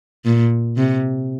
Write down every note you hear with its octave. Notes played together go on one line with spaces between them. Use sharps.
A#2
C3